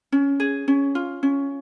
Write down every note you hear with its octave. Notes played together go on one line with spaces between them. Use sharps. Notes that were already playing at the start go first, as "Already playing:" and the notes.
C#4
G#4
C#4
F4
C#4